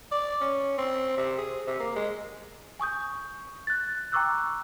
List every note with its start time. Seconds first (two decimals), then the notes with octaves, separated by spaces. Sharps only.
0.12 D5
0.41 C#4
0.78 C4
1.18 C3
1.38 G#4
1.67 C3
1.80 A#3
1.96 G#3
2.80 G#5 C#6 D#6 G6
3.67 F#6 A6
4.12 G5 A#5 C#6 D6 E6 F#6